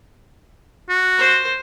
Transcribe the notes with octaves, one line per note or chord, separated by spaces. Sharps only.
F#4
C5